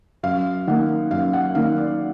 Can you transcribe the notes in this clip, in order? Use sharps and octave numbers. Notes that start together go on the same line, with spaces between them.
F#2 F5
D#3 A#3 F#5
F#2 F5
F#5
D#3 A#3 F5
D5